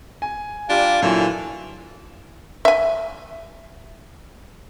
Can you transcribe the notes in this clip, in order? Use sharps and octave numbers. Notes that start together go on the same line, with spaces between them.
G#5
G3 D4 F4 G4 F5
A#2 D3 E3 F#3 F4
E5 G#5